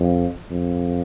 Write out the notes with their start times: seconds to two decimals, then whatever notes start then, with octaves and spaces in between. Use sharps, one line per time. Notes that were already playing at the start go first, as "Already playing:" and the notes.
Already playing: F2
0.51 F2